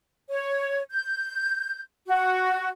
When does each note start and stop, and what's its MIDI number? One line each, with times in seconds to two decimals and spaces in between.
0.30 0.81 73
0.91 1.80 91
2.08 2.69 66